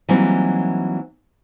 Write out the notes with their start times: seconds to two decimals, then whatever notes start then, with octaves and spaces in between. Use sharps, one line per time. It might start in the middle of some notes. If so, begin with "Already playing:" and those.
0.09 E3 F#3 G3 A#3 C4 D#4